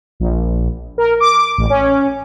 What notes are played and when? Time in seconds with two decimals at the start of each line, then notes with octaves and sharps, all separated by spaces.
0.20 A#1
0.98 A#4
1.20 D6
1.58 A1
1.70 C#4